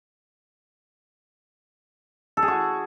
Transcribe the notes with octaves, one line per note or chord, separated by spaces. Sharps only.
A4
G#4
F#4